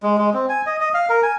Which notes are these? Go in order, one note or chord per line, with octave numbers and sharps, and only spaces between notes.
G#3
G#3
C4
G#5
D#5
D#5
F5
A#4
G#5